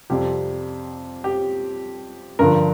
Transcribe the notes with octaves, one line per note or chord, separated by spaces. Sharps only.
F2 C3 G3 G4
G4
G2 D3 F3 A#4